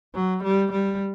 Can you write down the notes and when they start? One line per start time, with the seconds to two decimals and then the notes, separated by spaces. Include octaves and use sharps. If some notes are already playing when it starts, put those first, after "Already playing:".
0.14 F#3
0.44 G3
0.72 G3